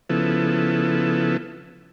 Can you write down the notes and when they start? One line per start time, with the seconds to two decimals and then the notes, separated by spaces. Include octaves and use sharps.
0.09 C#3 F3 B3 E4 A4